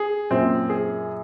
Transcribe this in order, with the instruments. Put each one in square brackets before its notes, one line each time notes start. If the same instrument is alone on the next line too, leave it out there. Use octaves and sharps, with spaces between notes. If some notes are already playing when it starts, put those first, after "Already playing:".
Already playing: [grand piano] G#4
[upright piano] F#2 A#2 [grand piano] C4
[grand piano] G#4